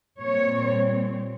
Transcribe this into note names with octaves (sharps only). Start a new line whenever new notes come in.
A#2 G3 C4 C#5